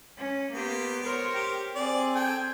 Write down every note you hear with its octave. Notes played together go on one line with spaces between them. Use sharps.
C#4
A#3 B3 G4 C6
A#4 C5 C#5
G4
C4 G#4 D5
A4 G5 G#5